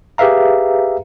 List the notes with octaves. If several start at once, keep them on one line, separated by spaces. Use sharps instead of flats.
G4 G#4 B4 E5 F5 A#5